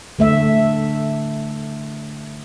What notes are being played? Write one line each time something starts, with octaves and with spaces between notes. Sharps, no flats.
D3 A3 E5